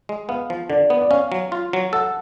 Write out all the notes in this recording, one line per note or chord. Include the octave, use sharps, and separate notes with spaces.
G#3
B3 F5
F3
D3 D5
B3
D5
C#4 F5
F#3
F4
F#3
A4 F#5